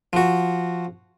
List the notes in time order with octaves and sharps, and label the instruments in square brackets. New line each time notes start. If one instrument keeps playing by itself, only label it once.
[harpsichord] F3 F#4